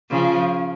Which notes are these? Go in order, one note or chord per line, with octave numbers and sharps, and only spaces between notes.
C#3 F3